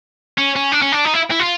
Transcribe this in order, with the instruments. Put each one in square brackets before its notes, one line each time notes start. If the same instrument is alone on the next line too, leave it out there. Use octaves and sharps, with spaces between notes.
[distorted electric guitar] C#4
C#4
D4
C#4
D4
D#4
E4
E4
F4